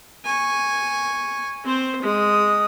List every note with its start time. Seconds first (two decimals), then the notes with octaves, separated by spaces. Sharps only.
0.25 G#5 C#6
1.64 C4 C5
2.02 G#3 D#6